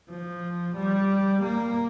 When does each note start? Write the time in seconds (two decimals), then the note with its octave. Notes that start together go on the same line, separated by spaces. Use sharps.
0.10 F3
0.76 G3
1.42 A#3